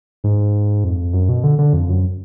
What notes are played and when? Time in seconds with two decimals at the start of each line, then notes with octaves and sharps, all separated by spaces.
0.24 G#2
0.84 F2
1.13 F#2
1.29 B2
1.44 D3
1.59 D3
1.73 F2
1.89 F#2